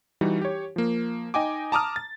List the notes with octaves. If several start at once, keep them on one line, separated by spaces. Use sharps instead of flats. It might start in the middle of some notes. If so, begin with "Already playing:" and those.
E3 G3 D#4 F#4
G4 C#5
F3 A#3
D#4 D#5 G5 G#5 D6
A5 A#5 D6 D#6 F6
A6